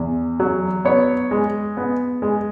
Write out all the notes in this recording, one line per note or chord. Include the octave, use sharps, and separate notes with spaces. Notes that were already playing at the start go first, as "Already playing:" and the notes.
Already playing: E2
F#3
B3 C#5
G#3
B3
G#3